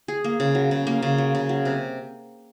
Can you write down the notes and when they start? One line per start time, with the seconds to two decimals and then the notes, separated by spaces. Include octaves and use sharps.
0.08 G#4
0.24 A#3
0.40 C#3
0.55 F#3
0.71 C#3
0.87 A#3
1.02 C#3
1.18 F#3
1.35 C#3
1.49 F#3
1.65 C3